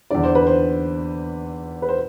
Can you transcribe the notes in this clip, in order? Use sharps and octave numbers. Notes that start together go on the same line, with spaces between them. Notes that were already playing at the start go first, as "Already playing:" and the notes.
E2 D3 D5
C5
B4
C5
B4
C5